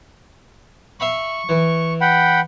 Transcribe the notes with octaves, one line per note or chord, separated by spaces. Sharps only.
E5 F5 B5 C#6
E3
F#5 G5 B5